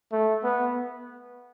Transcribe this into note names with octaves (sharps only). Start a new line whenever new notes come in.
A3
B3